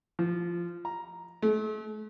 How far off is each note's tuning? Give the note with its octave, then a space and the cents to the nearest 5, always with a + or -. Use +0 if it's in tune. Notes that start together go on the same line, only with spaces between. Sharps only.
F3 -15
A#5 +5
A3 -40